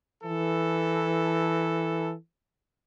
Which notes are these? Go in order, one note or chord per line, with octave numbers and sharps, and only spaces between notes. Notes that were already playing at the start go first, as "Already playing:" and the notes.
E3 A4